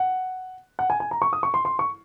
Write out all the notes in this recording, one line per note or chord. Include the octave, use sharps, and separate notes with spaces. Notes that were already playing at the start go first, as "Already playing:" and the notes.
Already playing: F#5
F#5
G#5
G#5
A#5
C#6
D#6
C#6
C6
C6
C#6